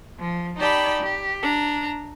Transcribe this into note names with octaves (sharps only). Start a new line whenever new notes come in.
F3
D#4 G4 D5 G5 A5 B5
G4
D4 A#5